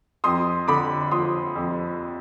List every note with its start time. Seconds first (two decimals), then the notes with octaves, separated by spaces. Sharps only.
0.24 F2 C6 D#6
0.68 D3 B5 D6
1.11 F3 C6 D#6
1.56 F2